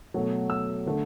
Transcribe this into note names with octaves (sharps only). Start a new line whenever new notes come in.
B2 F#3 A3
E6
D3 A3